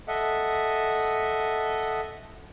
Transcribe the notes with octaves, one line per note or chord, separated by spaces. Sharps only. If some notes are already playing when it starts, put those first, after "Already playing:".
A4 D#5 E5 F#5